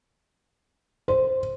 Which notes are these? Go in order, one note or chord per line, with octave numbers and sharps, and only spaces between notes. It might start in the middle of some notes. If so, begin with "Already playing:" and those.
C5